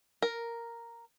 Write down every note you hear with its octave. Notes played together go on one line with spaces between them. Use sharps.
A#4